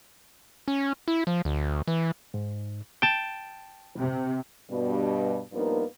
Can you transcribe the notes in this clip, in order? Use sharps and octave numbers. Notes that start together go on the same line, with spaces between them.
C#4
E4
F3
D2
E3
G#2
G5 A5
C3
G2 B2
G2 F3 A#3 B3 D#4 A#4